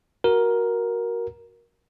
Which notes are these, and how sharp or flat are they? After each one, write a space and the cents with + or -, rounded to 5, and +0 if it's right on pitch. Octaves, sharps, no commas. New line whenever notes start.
F#4 +0 A#4 +10